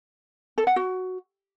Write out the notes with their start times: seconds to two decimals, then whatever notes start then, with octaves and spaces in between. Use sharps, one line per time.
0.58 A4
0.67 F#5
0.76 F#4